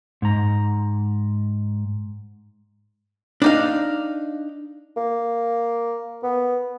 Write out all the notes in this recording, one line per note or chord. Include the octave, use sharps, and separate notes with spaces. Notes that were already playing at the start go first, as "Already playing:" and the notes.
G#2 A#5
D4 D#4 F5
A#3
B3